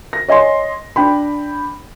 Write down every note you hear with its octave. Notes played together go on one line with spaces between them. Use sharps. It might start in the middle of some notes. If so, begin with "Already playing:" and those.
A#6
C#5 D#5 G#5 C6
D4 G5 B5